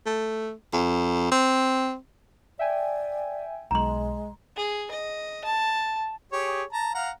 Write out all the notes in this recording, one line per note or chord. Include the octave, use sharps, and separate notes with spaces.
A3
F2
C4
D5 E5 G5 G#5
B1 G#3 A#5 C6
G#4
D#5
A5
G4 G#4 C#5
A5 A#5
F5 F#5 A#5